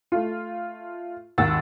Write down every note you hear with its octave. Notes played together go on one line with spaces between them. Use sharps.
A3 F4
G#1 D#2 F#5 E6 A6